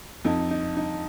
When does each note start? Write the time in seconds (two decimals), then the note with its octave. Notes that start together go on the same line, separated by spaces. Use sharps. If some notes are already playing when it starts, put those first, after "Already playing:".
0.25 F2 D#4
0.51 D#4
0.77 D#4